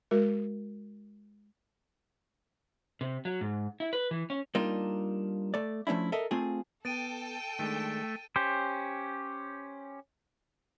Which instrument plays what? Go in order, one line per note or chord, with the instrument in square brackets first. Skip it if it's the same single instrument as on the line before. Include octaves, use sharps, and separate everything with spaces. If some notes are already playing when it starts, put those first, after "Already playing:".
[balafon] G#3 F#4 A#4
[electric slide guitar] C3
F#3
G#2
E4
B4
E3
C#4
[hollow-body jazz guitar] G3 A#3 D4 D#4 F4
A3 D5
F3 A3 C#4 D4 E4
A4 A#4 D#5 E5
A3 C4 F4 G#4
[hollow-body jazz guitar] B3 [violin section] A4 G5 [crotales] A6 D7 D#7
[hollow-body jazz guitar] D#3 G#3 D4 [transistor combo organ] A3
[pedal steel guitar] C#4 G4 C5